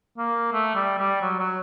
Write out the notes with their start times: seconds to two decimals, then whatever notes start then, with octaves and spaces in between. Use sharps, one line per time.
0.18 A#3
0.53 A3
0.75 G3
0.99 G3
1.21 F#3
1.40 F#3